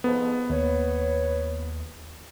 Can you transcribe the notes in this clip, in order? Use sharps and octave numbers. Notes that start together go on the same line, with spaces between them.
F2 G#2 F3 B3
D#2 B4 C#5